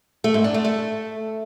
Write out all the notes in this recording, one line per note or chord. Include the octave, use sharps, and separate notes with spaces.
A3
G#2
D4
A3
A3